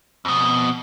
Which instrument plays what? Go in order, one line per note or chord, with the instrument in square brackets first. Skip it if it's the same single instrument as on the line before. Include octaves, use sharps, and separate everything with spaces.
[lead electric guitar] F2 B2